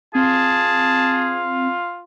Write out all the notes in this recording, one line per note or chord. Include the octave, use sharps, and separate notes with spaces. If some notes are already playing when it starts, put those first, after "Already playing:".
C4 F4 G#4 A5